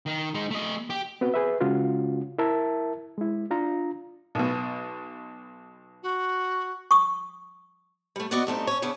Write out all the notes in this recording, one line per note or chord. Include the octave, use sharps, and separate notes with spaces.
D#3
G#3 D#4
A3 D#5
G4
B3 C4 F#4 B4
G#4 B4 E5
C#3 G#3 C#4 F4 F#4
E4 A#4 E5 A5
G#3 E4
D4 F4 A#5
B1 B2
F#4
C#6 D#6
G3 A3
B3 F#4 D5 D#5 F#5
G2 A3 C4 D#4
C#4 C#5
C#3 B3 C#4 D4